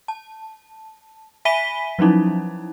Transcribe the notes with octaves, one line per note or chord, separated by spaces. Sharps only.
A5
E5 G#5 B5 B6 D#7 G7
F3 F#3 C#4 D#4 E4